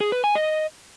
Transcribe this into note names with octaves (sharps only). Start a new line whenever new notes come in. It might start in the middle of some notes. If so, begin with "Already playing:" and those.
G#4
B4
G#5
D#5